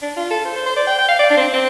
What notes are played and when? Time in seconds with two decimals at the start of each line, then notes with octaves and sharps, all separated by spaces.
0.02 D4
0.17 F4
0.31 A4
0.45 C5
0.56 C5
0.66 C5
0.76 D5
0.87 G5
0.98 G5
1.08 F5
1.19 D5
1.30 D4
1.37 C4
1.53 C4